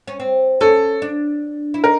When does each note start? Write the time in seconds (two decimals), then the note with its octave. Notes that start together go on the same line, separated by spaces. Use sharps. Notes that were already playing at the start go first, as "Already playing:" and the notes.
0.07 C#4
0.20 C4
0.61 C#4 A4
1.02 D4
1.74 E4
1.84 D#4 A#4